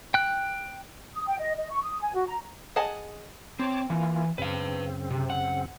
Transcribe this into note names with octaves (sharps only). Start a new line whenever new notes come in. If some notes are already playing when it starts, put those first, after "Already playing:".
G5 F#6
D#6
G5
D#5
D#5
C#6
D#6
G#5
F#4
A#5
G#4 D#5 F#5 G#5 A5
C4 C#5 A5 D6
E3 A#3 E4 F4
F#2 C#3 C4 B4 F5
C3
F#5